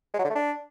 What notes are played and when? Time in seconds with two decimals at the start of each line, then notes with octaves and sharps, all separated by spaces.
0.14 G#3
0.19 F#3
0.25 D3
0.30 A3
0.35 D4